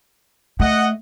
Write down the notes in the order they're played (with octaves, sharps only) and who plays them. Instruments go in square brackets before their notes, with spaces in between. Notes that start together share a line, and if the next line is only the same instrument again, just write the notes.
[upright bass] A3 [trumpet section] D#5 F#5